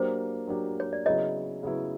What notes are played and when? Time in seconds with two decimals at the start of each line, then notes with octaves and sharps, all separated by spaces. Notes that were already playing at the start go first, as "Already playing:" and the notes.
Already playing: F#3 A#3 D4 G4 C5
0.47 F#3 A#3 D4 G4
0.80 C#5
0.93 D5
1.05 C#3 F#3 B3 E4 C#5 D#5
1.63 C#3 F#3 B3 E4